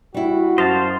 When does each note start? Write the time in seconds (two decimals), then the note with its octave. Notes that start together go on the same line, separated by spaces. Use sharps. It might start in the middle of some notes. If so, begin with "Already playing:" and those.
0.14 G3 E4 F#4
0.58 F#2 C5 D#5 F5 A5